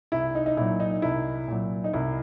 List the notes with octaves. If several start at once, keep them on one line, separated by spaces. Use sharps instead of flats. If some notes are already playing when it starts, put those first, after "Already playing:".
C2 E4
D#4
D#4
A#2 F#3 E4
D#4
C2 E4
A#2 F#3
D#4
C2 E4